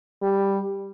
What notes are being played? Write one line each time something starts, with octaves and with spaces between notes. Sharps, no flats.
G3